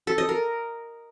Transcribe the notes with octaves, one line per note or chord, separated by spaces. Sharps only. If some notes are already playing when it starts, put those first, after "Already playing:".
A4
D#5
A#4